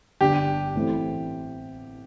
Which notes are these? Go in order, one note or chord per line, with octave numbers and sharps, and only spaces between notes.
G1 G2 G3 D4 G4
A1 A2 A3 C4 E4